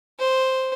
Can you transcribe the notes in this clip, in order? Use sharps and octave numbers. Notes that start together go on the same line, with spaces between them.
C5